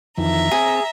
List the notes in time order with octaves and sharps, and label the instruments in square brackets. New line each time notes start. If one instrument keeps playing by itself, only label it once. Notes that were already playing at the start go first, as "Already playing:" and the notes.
[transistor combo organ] F2 D#3 E3 [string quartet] E5 A#5
[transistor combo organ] C4 [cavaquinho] G#4